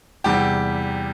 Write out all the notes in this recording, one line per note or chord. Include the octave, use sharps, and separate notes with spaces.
E2 C3 G3 G4